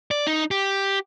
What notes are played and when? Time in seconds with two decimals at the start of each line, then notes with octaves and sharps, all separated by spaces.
0.11 D5
0.27 D#4
0.51 G4